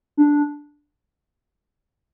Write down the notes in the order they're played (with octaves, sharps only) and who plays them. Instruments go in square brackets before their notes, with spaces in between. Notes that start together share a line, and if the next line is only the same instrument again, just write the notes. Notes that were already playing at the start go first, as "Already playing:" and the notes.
[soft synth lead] D4